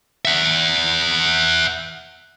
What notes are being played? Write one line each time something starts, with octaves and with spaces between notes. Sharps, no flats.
E5 F#5